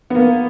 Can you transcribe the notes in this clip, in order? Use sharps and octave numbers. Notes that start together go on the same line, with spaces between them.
B3
A#3